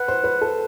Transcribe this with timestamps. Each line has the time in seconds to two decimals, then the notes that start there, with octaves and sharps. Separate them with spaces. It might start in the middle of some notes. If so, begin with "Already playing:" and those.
Already playing: B4 F#5
0.08 C5
0.24 B4
0.41 A4